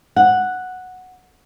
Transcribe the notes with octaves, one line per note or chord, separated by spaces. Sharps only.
F#5